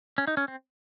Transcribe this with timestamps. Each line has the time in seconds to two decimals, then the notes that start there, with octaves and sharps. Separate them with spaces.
0.18 C#4
0.27 D#4
0.37 C#4
0.48 C4